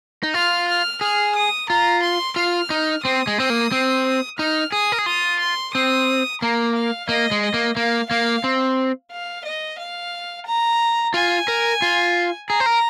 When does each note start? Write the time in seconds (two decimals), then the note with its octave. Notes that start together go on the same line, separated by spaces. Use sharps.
0.23 D#4
0.34 F4 F6
0.68 F6
1.01 G#4 F6
1.36 D#6
1.70 F4 A#5
2.03 C6
2.36 F4 F6
2.70 D#4
3.04 C4 D#6
3.27 G#3
3.38 C4 D#6
3.50 A#3
3.72 C4
4.39 D#4 F6
4.72 G#4 D#6
4.92 A#4
4.99 G#4
5.06 F4 D#6
5.40 C6
5.74 C4 D#6
6.42 A#3 A#5
6.75 F5
7.09 A#3 D#5
7.31 G#3
7.43 D#5
7.54 A#3
7.76 A#3 F5
8.10 A#3 F5
8.44 C4
9.12 F5
9.45 D#5
9.79 F5
10.46 A#5
11.14 F4 G#5
11.48 A#4
11.82 F4
12.49 G#4 A#5
12.60 C5
12.66 A#4